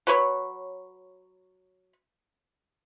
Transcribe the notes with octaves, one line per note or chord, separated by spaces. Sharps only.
F#3 B4 C#5